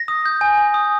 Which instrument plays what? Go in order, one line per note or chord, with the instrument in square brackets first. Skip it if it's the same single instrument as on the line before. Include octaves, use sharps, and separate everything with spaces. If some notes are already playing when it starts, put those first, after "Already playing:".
Already playing: [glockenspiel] A#6
D#6
G6
G#5
G#5
D#6